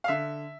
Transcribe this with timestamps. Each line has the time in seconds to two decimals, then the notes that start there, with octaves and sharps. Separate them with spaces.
0.04 F5
0.08 D3 E5